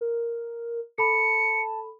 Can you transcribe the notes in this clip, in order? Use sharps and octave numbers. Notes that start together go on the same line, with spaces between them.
A#4
A4 A5 B5 C#7